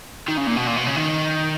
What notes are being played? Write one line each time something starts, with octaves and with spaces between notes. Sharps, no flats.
D#3
C#3
A#2
B2
A#2
B2
C#3
D#3